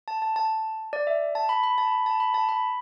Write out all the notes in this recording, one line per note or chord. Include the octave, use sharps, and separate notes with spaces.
A5
A5
A5
D5
E5
A5
B5
B5
A5
B5
A5
B5
A5
B5